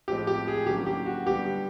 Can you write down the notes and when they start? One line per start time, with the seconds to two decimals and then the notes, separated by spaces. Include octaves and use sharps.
0.08 A2 F3 G#3 C4 G4
0.27 G4
0.48 G#4
0.67 D3 F#3 A#3 C#4 E4 G4
0.86 G4
1.06 F#4
1.26 D3 G3 B3 G4